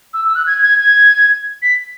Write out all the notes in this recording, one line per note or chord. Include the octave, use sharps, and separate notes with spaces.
E6
E6
F#6
G#6
G#6
G#6
B6